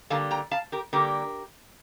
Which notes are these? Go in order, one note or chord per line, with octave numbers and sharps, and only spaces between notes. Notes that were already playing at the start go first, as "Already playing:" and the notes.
D3 G3 A#3 F5 A5
G5 A#5
F5 A5
G4 A#4
D3 G3 A#3 G4 A#4